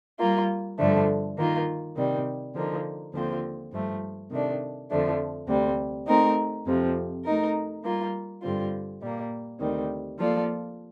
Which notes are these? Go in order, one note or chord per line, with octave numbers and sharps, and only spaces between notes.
G3 A#3 F4
G2 D3 F3 A3 D4
D#3 A#3 F4
C3 D#3 G3
D3 F3 A#3 D#4
D#2 D3 F3 C4 F4
G2 F3 A3
C3 D#3 A3 D4
F2 D3 F3 A3 D4
D2 C3 G3
A3 C4 D#4 A#4
F2 C3 F3
A3 D#4 A#4
G3 A#3 F4
G2 D3 G3 C4 F4
A#2 G3 A#3
D2 C3 D#3 G3
F3 A#3 F4 A4 D5